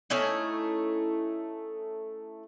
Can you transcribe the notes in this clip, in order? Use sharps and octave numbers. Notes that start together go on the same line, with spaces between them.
A3 C#4 D#4 E4